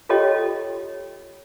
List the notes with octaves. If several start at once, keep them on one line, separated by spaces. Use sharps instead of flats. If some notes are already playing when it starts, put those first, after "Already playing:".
F4 G4 A4 C#5 D#5 G5